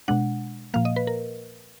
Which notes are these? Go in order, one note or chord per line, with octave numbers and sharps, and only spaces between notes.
B2 G#3 D4 F#5
A#2 F3 A#3 F5
D#5
B4
A#4